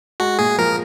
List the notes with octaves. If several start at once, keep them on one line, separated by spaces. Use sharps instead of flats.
G#3 F#4
A#2 G#4
F3 A#4